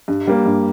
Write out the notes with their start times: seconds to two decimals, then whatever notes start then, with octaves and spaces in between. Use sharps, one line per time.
0.08 G2
0.27 G3 A#3
0.46 G2